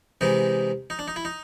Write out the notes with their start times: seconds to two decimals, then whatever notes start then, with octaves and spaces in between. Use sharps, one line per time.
0.21 C3 E3 G#3 D#4
0.90 D#4
0.99 D4
1.08 D#4
1.16 E4
1.25 D#4